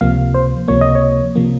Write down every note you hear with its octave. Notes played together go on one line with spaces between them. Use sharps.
C#2 C3 F3 A#3 F5
C5
C#2 C3 F3 A#3 C#5
D#5
C#5
C3 F3 A#3